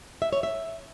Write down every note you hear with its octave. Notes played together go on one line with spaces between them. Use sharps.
E5
C#5
E5